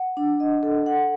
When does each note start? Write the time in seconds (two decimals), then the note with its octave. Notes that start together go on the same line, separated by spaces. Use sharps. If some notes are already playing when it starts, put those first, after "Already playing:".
Already playing: F#5
0.17 D4
0.40 D#5
0.63 A4
0.86 F#5